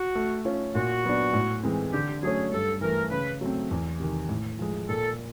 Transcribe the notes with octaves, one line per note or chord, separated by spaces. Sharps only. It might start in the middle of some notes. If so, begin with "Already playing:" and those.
Already playing: F#4
A3
C#4 F4
A#2 F#4
F#3 B3 D4
A2
E3 G#3 C4
D3 G4
F#3 A3 C#4 G#4
G2 A4
E3 A3 A#4
C#3 B4
F#3 A3 C4
E2
C3 D#3
A2
F3 G#3
A#2 A4